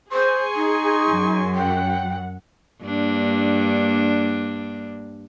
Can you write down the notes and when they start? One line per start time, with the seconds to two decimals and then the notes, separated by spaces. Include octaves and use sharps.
0.12 G#4 C5 G#5 C6 C#6
0.56 D#4
1.07 F#2
1.55 F#5 G5
2.83 G2 A#3 D4